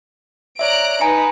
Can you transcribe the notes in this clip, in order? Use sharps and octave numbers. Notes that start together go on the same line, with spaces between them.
C#5 D5 E5 A#5 F#6 D7
D#4 B4 G#5 A#5 C#7